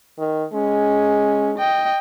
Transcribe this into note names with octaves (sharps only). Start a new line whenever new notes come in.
D#3
G#3 C#4
D#5 G5